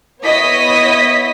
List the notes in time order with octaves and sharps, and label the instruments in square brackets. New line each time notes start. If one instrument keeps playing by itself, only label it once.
[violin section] B3 E4 C#5 D#5 D#6 B6